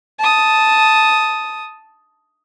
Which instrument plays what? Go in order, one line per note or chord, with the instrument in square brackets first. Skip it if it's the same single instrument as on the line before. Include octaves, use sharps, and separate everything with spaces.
[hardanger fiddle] A5 D#6